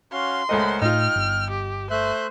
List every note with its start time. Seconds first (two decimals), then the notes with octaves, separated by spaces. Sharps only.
0.12 C#4 F#4 F5 C6
0.49 C#2 A3 A#4 C5 D#5 F#5
0.82 A2 D#4 F4 G5 F6
1.16 G1
1.50 G4
1.91 A3 C5 E5 F#6